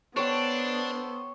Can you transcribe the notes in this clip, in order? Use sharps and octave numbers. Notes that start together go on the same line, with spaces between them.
B3 D4 A4 C5 C#5 G5